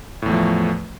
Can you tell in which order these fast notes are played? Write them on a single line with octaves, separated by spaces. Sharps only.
A2 E2 A3 F3